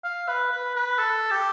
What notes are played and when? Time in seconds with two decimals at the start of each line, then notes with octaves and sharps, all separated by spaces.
0.04 F5
0.28 B4
0.51 B4
0.75 B4
0.99 A4
1.31 G4